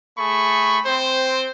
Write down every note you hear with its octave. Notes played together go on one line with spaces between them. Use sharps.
A3 G#4 B5 C#6
C4 C5